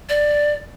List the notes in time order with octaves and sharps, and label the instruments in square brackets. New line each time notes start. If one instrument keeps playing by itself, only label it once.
[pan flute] D5